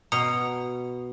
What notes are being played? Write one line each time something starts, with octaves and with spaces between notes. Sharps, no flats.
B2 A#5 D#6 C#7